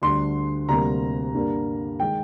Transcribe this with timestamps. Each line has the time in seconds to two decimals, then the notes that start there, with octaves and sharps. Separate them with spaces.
0.02 D2 D3 G3 C6
0.69 D2 C3 G3 A#3 A#5
1.34 G2 D3 G3 A#3
2.00 D#3 G#3 G5